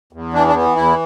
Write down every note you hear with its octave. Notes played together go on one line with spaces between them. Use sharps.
E2
E3 D4
D4
E3 B3
E2 E4